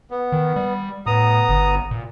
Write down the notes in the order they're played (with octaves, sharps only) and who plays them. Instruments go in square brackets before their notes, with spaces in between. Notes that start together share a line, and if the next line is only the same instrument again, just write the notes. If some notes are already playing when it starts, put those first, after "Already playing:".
[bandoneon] B3
[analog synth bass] D#3
G3
[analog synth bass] A2 [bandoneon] B3 A#5 D#6
[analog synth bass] G1
A#2